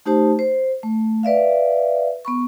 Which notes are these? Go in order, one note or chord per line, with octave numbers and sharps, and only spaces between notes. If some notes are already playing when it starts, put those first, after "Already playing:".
A3 D#4 G4 C5 A5
C5
A3
B4 D5 E5 F5
B3 B5 C#6